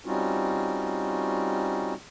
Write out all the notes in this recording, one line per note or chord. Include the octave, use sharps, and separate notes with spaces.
G3 C4 C#4 D#4 F4 F#4